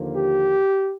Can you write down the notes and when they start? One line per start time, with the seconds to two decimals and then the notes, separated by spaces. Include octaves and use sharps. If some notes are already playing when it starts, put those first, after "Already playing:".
Already playing: D#2 D3 F3 A#3
0.17 G4